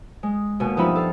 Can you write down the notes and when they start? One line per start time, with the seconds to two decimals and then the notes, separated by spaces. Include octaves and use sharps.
0.23 G#3
0.60 D#2 B2 B3 G#5
0.77 G2 F3 B3 D#4 E5 B5
0.96 A4 F5